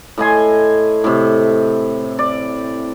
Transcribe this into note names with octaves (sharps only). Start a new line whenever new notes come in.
A2 D#5 G#5 C6
A2 C3
D5